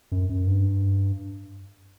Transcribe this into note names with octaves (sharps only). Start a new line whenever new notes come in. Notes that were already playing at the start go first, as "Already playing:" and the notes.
F#2
F#2
G2